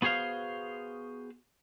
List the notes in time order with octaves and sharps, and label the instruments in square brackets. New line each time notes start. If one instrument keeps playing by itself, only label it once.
[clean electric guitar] B3 F#4 G#4 C5 F5